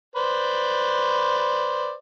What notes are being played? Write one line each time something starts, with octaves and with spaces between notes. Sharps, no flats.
B4 C5 D5